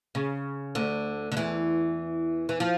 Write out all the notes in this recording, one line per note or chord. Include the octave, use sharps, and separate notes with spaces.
C#3
D2 D3
D3
E2 E3
E3
F3